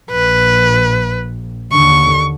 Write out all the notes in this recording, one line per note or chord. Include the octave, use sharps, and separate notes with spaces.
A#1 B4
D#2 D3 C#6